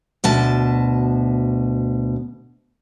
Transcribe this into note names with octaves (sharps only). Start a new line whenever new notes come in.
D2 B2 A5